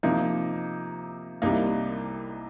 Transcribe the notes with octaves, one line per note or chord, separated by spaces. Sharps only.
C3 F3 A#3 D#4
C2 C3 G3 A#3 D#4